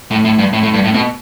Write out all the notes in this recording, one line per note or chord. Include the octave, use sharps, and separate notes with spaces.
A2
A2
G2
A2
A2
G2
A2
B2